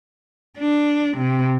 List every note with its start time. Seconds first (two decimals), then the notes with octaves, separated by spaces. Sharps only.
0.58 D4
1.17 C3